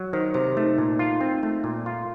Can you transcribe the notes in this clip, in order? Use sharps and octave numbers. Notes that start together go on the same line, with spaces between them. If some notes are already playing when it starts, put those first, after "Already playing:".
Already playing: F#3
D#3 C5
C3 C5
A3 D#4
A#2
F4
C4
A3
A#2
F4